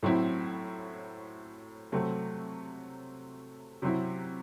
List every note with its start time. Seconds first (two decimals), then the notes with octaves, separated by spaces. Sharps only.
0.03 A2 F#3 C4 E4
1.92 C3 F#3 A3 C4
3.82 C3 F#3 C4 E4